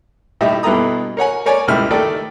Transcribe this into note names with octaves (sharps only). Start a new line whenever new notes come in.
A2 G3 D#4 E5
G2 B2 E4 A4 A#5 D#6
A#4 C#5 F#5 G#5
A#4 C#5 D5 G#5
C#2 G3 A3 E4 F6
D#3 A3 A4 D5